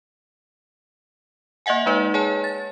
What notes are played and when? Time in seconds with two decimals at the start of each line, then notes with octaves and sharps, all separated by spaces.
1.66 A#3 D#5 E5 F#5 G#5
1.86 G#3 D#4 B4 D5
2.14 G#4 C#5 G#5 A5
2.44 A6